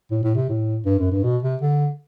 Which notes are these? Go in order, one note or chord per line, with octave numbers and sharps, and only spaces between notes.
A2
A2
C3
A2
G2
F#2
G2
B2
C3
D3